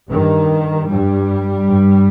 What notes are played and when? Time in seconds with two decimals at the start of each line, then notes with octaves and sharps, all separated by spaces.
0.10 G2 D#3
0.88 G2 G3
1.67 G2